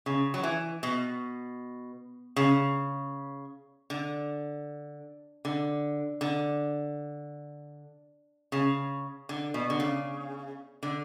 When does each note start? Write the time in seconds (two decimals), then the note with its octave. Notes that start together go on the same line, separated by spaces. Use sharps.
0.06 C#3
0.34 F#3
0.43 E3
0.83 B2
2.36 C#3
3.90 D3
5.45 D3
6.21 D3
8.52 C#3
9.29 D3
9.54 B2
9.70 D3
9.80 C#3
10.83 D3